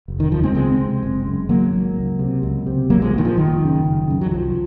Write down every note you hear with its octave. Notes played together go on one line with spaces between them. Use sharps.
F1
D#3
D#2 C#3 F3
G#3 C4
C#2 G#3 C4
C3
F#1
F#2 C#3
G#1 F#3 A#3
G#2
C#2
C3
C#2
C3
A#1 F#3 A#3
F3 G#3
A#2 D#3
F3
F#1 D#3
F#2 C#3
F#1
F#2 C#3
F#3
C2 F3